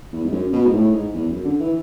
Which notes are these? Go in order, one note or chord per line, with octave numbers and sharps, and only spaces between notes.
E2
G#2
F#2
B2
G#2
A2
G#2
E2
F#2
D3
E3